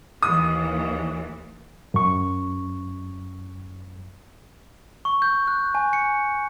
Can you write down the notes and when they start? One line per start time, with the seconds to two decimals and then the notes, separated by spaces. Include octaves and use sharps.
0.23 D#2 E3 D#6
1.94 F#2 C#6
5.05 C#6
5.22 G6
5.48 F#6
5.75 G#5
5.93 C#7